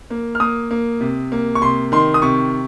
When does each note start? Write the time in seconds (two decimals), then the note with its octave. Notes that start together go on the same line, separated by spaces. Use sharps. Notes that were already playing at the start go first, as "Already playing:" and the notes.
0.10 A#3
0.35 F6
0.40 A#3 D#6
0.71 A#3
1.01 C3
1.32 A#3
1.55 C#6
1.62 C3 C6
1.92 D#3 C6
2.14 D#6
2.22 C3 C#6